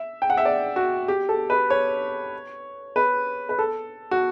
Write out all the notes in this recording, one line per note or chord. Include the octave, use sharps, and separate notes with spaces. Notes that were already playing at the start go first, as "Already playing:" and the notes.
Already playing: E5
G5
F#5
E5
D5
F#4
G4
A4
B4
C#5
B4
B4
A4
F#4